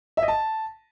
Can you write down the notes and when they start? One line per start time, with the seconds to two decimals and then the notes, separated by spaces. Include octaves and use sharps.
0.17 E5
0.23 D#5
0.28 A5